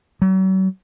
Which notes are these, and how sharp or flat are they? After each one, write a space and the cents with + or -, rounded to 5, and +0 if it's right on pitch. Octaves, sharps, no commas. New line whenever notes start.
F#3 +40